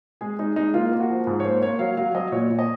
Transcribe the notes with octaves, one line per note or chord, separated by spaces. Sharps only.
G#3 G#4
G#3 D#4
G#3 D#4
A#3 F4
A#3
F#4
F3
G#2 G#4
C#5
A#3 C5
A#3 C#5
F#3 F5
F#3 F5
F#3 D#5
A#2 C#5
A#2
D#5